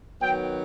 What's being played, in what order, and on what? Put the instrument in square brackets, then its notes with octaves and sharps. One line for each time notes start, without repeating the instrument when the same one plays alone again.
[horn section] D#3 F#3 B3 G5